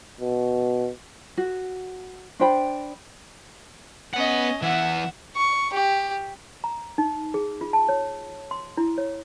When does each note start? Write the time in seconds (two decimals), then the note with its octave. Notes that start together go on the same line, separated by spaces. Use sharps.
0.21 B2
1.38 F#4
2.40 D4 C5 G5 B5
4.14 B3 C#4 D#5 F#5
4.62 E3 B3 E5 F#5
5.36 C#6
5.73 G4
6.64 A#5
6.98 D#4
7.34 G#4
7.61 F4
7.73 A5
7.89 C#5
8.51 C6
8.77 E4
8.98 C#5